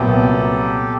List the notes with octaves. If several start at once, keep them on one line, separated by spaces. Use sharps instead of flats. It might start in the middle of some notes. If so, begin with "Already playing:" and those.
Already playing: C2 A#2 F#3 B3 G4 A4